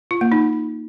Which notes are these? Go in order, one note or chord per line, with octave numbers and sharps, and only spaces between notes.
F4
A#3
D#4